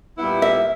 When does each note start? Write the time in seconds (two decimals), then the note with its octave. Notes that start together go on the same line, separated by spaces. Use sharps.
0.17 A#2 G3 B3 E4
0.42 E5